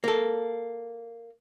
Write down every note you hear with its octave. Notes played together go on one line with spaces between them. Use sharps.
A#3 A4